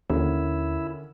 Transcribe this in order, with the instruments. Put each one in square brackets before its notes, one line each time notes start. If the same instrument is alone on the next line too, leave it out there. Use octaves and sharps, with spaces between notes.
[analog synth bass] D#2 [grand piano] D3 D#3 C#4 [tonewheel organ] E4